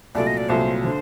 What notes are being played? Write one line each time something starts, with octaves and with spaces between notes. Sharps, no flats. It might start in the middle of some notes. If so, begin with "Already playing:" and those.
C2 A#2 F#3 A3 D5
D#5
D5
C2 A#2 F#3 A3 C5
D3 C5